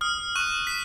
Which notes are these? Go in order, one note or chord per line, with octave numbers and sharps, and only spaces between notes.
D#6 F6
C#6 F#6 D#7
B6